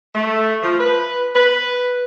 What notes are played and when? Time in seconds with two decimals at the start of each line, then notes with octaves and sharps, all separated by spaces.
0.15 A3
0.63 F3
0.79 B4
1.35 B4